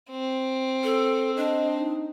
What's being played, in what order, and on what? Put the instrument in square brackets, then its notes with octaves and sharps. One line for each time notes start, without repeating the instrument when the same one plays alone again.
[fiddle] C4
[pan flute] A4
[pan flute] D4 [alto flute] D#5
[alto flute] D#4